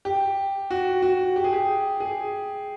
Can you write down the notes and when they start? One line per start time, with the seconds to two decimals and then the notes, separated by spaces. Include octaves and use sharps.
0.05 G4
0.70 F#4
1.02 F#4
1.36 G4
1.44 G#4
1.53 G4
2.00 G#4